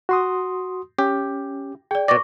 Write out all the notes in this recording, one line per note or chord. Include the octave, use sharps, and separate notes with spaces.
F#4 C6 D#6
C#4 G4
G#4 D5 G5
B2 D5 C#6 D6 A#6